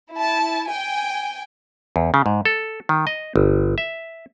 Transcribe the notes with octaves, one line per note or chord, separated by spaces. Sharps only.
E4 A5
G5 G#5
E2
C#3
G#2
A4
D#3
D#5
G1
E5